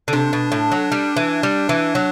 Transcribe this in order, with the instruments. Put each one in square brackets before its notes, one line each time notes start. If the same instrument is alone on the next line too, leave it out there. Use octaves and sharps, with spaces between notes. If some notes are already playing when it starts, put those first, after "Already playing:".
[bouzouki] D3
[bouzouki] C3 [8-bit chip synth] D4
[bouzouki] B2
A2
F#3
G3
E3
G3
E3
F#3